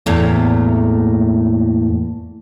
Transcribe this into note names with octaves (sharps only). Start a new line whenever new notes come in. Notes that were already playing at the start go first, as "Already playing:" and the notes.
E2 A2 A3 A#3